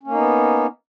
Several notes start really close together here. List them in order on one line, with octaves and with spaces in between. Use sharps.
C#4 A#3 D#4 B3